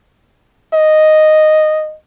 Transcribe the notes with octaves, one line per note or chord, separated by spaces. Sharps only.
D#5